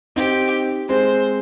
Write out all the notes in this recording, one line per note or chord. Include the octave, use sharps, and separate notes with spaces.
C4 D#4 G4
G#3 C4 C5